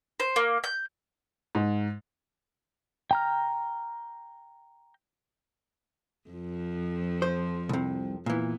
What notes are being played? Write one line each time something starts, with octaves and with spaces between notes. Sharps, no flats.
C5
A#3
G6
G#2
G5 A#5 F6
F2 F3
C5
C2 C3
A#2 E3 B3